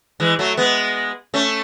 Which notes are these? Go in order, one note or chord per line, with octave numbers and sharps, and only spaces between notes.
E3 G#3
F#3 A3
G#3 B3
A3 C#4